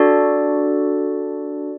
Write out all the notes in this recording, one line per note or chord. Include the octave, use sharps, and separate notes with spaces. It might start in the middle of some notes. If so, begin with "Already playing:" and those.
Already playing: D4 F#4 A4 D5